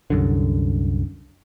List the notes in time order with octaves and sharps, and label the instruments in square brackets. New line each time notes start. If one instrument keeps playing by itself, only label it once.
[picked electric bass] C2 F#2 D3